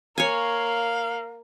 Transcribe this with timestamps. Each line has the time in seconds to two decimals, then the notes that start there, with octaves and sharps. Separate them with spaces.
0.18 A#3 C#5 F5 G#5